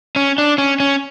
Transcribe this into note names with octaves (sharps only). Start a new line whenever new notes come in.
C#4
D4
C#4
C#4